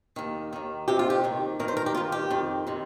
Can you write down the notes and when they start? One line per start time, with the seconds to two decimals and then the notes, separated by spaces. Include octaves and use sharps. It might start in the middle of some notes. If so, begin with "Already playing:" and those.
0.16 D#2 D#3
0.53 D#2 D#3
0.88 F2 C3 D#3 G4
0.99 F4
1.10 G4
1.24 D#2 D#3
1.59 G2 D#3 A#4
1.68 C5
1.77 A#4
1.86 G4
1.95 G2 D#3 F4
2.12 G4
2.30 F2 D#3
2.67 C3 D#3